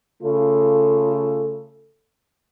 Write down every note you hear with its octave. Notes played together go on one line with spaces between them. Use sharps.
C#3 A3 F4 A4